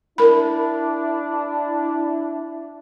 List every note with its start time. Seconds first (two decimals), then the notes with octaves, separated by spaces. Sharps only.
0.18 D4 E4 A#4 B5